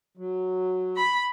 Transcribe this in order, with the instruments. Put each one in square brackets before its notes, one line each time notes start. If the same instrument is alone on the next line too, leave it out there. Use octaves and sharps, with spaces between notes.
[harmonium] F#3
[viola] B5